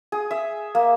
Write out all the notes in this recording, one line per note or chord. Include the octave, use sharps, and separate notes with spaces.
G#4
E5
A#3